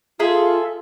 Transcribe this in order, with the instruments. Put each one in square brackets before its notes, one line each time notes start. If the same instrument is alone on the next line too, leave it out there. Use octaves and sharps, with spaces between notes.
[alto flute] F4 [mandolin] G#4 A4 E5